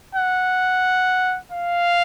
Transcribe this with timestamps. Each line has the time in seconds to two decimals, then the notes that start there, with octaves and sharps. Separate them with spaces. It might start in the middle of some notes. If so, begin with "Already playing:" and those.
0.15 F#5
1.52 F5